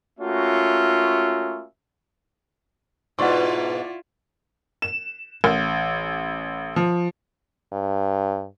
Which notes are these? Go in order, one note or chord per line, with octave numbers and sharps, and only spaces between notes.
A3 A#3 C#4 F4 F#4 E5
G#2 B2 E4 F4 D5 F#5 C6 C#6
E7
A1
F3
G2